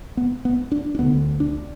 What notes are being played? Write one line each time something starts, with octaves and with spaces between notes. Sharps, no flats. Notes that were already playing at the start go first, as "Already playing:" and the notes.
B3
B3
D4
D4
D2 D3 B3
D4